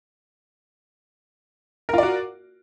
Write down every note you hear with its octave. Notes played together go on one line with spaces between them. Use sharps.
F4 F#4 A#4 D5